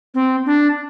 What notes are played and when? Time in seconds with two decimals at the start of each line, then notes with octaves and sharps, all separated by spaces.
0.14 C4
0.46 D4